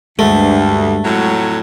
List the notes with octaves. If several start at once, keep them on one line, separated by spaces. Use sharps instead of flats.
D2 G2 G#3 A3
F2 A2 F#3